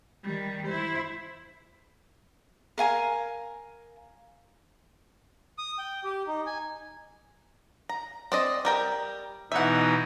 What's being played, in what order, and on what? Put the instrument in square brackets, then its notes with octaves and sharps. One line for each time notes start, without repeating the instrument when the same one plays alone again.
[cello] D#3 G3
E4 C5
[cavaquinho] A#4 F5 G#5 A#5
[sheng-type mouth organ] D#6
G5
G4
D#4
G#5
[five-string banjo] A#5
C4 D5 D#5
G3 A#4 G5
[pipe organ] B2 E3 D#4 [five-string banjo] E5 F#5